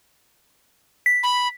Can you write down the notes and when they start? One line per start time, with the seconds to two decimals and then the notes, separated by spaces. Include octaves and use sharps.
1.06 B6
1.23 B5